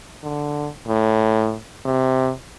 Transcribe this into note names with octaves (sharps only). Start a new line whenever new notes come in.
D3
A2
C3